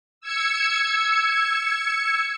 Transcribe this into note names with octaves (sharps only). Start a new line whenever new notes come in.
E6 G#6 C#7